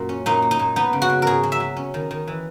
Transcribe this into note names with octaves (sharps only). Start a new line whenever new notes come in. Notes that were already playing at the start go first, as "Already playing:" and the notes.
Already playing: F#2 A#2
C#4
A#2 D#4
A#3
D#4
A#2
B3 D#4
C#3
F#4
C#3
G#2 G#4 A#4
F#3
E5
F#3
C#4
D#3
D#3
E3